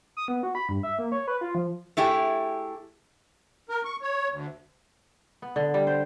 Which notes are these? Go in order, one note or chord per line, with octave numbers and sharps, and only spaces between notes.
D#6
B3
F#4
B5
G2
E5
A#3
C#5
B4
F4
F3
A3 E4 G4 G#4
A#4
C#6
C#5
D2
B3
D3
G3
C5